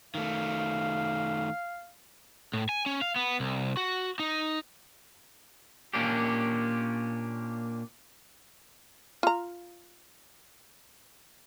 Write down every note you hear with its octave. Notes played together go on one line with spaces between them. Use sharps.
D#3 A3 F5
A2
G#5
C#4
F5
B3
C2
F#4
D#4
A#2 A#3 C#4 D4 G4
F4 A#5